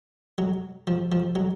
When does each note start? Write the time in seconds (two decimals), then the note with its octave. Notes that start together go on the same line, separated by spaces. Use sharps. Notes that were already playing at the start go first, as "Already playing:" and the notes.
0.38 F#3
0.87 F3
1.12 F3
1.35 F#3